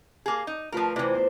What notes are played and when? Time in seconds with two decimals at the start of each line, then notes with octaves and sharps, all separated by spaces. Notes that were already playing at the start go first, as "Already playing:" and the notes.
0.26 A#3 G#4
0.47 D#4
0.72 D2 F3 F4 A#4 B4
0.96 C3 E3 E4 C5 D5
1.14 E2 C5